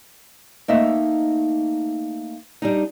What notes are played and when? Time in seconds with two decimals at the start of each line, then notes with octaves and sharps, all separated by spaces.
0.68 A3 A#3 D#4 D#5 E5
2.62 G3 D4 D#4